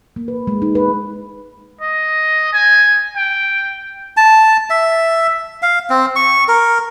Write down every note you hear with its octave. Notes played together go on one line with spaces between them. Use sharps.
A#3
B4
G#3
D#4
B4
D#5
G#5
G5
A5
E5
F5
C4
C#6
A#4